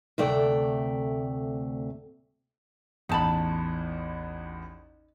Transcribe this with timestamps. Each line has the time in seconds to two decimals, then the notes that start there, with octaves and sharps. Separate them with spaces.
0.18 D2 C3 A3 D5 G5
3.09 A1 E2 D#4 A5 B5